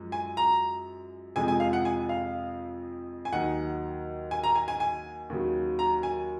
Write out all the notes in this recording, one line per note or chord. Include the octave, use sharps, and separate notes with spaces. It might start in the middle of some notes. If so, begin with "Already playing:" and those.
Already playing: F#2 F3 G#3
G#5
A#5
F2 C3 F3 G#3 G#5
G#5
F5
F#5
G#5
F5
G#5
D#2 D#3 F#3 F#5
G#5
A#5
G#5
G#5
G#5
D#2 C#3 F#3
A#5
G#5